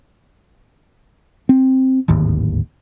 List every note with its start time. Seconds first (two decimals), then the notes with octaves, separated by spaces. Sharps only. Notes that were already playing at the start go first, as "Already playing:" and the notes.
1.49 C4
2.08 D1 G#1 D#2